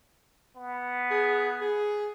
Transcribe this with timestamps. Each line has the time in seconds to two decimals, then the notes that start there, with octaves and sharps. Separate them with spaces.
0.56 B3
1.11 G#4
1.61 G#4